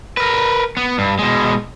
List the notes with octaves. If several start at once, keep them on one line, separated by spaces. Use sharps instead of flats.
A#4 B4
B3
G2
B2 G#3